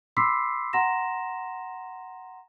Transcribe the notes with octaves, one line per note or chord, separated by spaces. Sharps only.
B5 C6 D6 E6 B6 C7
F#5 A#5 C6 A#6 E7